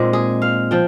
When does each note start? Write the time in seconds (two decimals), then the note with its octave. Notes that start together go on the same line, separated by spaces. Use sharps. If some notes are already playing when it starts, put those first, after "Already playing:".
Already playing: A#2 G#3 C4 D#4
0.13 G#4
0.42 F5
0.71 F3 G5